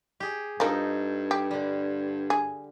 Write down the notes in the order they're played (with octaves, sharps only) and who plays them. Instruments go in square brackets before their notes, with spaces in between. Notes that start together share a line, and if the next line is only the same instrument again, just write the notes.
[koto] G4 G#4
[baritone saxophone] G2 [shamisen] F3 A#4 [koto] D#4 A4
[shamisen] G4
[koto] D3 G3
[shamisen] G#4